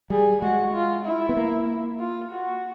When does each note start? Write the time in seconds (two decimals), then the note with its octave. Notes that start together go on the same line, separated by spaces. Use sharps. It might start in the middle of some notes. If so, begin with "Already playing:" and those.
0.10 G3 G#4
0.42 G#3 F#4
0.74 F4
1.05 E4
1.29 B3
1.37 A#3
1.99 F4
2.31 F#4